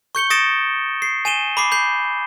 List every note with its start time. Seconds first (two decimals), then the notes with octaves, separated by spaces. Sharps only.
0.15 C#6 G6 C#7 G7
0.30 D#6 A6 A#6 C#7 D7 E7
1.02 C7
1.25 G#5 D#7 E7 G7
1.57 B5 D6 C7
1.71 B5 G6 C7